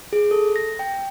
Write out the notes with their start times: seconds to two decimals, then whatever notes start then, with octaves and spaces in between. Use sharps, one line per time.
0.13 G#4
0.31 A4
0.56 A#6
0.79 G5